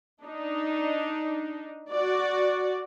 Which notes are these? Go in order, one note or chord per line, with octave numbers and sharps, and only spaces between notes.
D4 D#4
F#4 D5